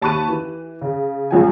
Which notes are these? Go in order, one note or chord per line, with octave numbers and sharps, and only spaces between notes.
D#2 A5 B5 C#6 F#6 D#7
E3
C#3
G1 C#2 F3 G5 G#5